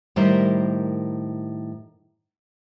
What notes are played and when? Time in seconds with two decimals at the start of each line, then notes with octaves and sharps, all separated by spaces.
0.16 A2 D#3 G3 G4 A#4 C5